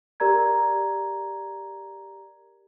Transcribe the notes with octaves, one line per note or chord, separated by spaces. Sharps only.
G4 A#4 D5 A#5 G#6